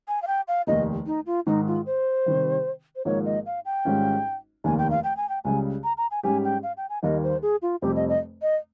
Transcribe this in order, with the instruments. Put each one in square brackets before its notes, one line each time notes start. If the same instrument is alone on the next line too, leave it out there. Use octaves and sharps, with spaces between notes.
[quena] G#5
F5
G5
F5
[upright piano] F1 D#2 D#3 [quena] D#5
[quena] D#4
F4
[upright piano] G#2 D#3 G#3 [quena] D#4
[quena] F4
C5
[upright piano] C3 D#3 G3
[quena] C5
[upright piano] G#1 G#2 F3 A#3 D#4 [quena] C#5
[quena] D#5
F5
G5
[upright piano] G#1 G#2 G3 C#4 F4
[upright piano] F1 D#2 D#3 A#3 [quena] G#5
[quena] G5
F5
G5
G#5
G5
[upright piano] C#2 C#3 G3 [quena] G#5
[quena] A#5
A#5
G#5
[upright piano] G#2 G3 C#4 G4 [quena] G#5
[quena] G5
F5
G5
G#5
[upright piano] D#2 D#3 G3 A#3 [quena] D#5
[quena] C5
G#4
F4
[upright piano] F1 F2 C3 G3 C4 [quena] G4
[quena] D#5
D#5
D#5